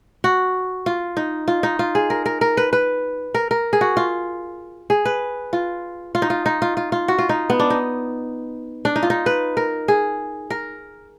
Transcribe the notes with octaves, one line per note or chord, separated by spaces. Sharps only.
F#4
F4
D#4
F4
D#4
F4
G#4
A#4
A#4
A#4
B4
B4
A#4
A#4
G#4
F#4
F4
G#4
B4
F4
F4
D#4
F4
D#4
F4
F4
F4
F#4
F4
D#4
B3
D4
D#4
D4
D#4
F4
D#4
B4
A#4
G#4
A#4